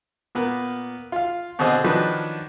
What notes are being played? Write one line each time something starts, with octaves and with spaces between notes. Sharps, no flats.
A#2 A#3 B3
F4 F5
B2 D3 C4 G#4 C5 D#5
D#3 F3 F#3 D4 B4